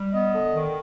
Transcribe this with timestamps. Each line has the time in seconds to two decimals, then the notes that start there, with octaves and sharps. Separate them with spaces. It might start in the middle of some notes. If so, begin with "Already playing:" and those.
Already playing: G3
0.13 B3 D#5
0.35 D3
0.54 D#3